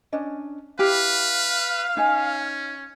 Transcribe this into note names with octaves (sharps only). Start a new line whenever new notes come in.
C#4 D4 D#5
E4 G4 B4 F5
C#4 D#4 C#5 G#5